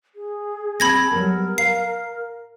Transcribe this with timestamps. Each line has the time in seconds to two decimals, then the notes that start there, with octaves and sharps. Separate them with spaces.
0.16 G#4
0.80 C4 A5 B5 G#6 A#6
1.11 F#3 G3 B3 A#4
1.58 F5 C7